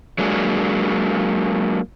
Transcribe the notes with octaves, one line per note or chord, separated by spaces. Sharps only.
F#3 G#3 A#3 D4